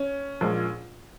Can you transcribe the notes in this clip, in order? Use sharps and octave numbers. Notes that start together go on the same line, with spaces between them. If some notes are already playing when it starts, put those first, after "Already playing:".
Already playing: C#4
A#1 A#2 G#3